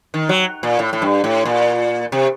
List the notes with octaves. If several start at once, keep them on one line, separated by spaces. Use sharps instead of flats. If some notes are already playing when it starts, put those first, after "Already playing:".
D#3
F#3
A#2
A2
A2
G2
A2
A#2
C3